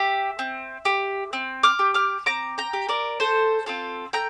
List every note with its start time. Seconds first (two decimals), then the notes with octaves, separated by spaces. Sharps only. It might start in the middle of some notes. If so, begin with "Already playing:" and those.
Already playing: G4 E5
0.39 C4
0.85 G4
1.33 C4
1.63 D6 F6
1.79 G4
1.94 D6 F6
2.26 C4 A#5 D6
2.58 G5 A#5
2.73 G4
2.89 A#4 D5
3.20 A3 A4 C5
3.66 C4 F4 A4
4.13 A3 G5 A#5